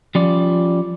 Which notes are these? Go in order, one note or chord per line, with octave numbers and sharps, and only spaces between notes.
F3 G3 C#4 F4 D5